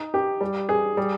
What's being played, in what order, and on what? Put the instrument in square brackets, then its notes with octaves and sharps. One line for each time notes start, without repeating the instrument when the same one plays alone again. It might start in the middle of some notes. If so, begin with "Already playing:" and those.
Already playing: [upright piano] D#4
G4
G3
G#4
G3